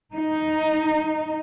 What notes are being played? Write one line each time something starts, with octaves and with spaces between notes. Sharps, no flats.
D#4